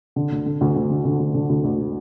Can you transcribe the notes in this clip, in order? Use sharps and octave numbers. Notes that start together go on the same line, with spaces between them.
D3
D2
D3
D2
D2
D3
D3
D2
D3
D2
D2